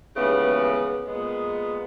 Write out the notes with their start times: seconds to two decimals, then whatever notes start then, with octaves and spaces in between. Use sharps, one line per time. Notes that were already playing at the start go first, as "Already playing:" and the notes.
0.15 D#2 C#3 E3 G#3 B3
1.05 A#2 G#3 B3